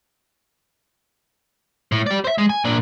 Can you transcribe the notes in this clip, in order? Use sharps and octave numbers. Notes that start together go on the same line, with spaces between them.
A2
G4 D5
C5 E5
G#3
G#5
A#2 D4